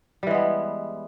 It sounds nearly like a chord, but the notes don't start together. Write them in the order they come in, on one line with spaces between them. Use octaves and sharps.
G3 E3 G#3 B3